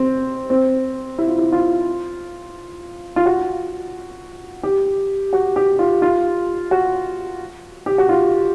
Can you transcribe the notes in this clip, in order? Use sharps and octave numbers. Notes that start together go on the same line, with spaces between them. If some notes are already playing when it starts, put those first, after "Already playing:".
Already playing: C4
C4
E4
F4
E4
F4
F4
F#4
G4
F#4
G4
F4
F4
F#4
G4
F#4
F4